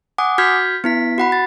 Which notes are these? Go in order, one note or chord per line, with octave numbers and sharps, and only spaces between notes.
F#5 G#5 D6 D#6
F#4 F6 G6 G#6 B6
B3 E4 B6
F#4 F#5 B5
A6